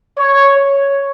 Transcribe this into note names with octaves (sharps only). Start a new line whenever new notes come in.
C#5
C#5